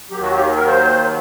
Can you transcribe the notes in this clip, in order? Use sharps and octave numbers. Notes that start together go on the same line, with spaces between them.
D#2 D#3 F#3 G4
F#4
G4
A#4
C5